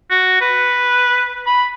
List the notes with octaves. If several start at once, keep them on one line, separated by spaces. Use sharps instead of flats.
F#4
B4
B5